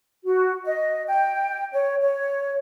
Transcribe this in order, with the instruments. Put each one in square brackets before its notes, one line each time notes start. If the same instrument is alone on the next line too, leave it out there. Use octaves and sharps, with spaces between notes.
[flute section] F#4
D#5
G5
C#5
C#5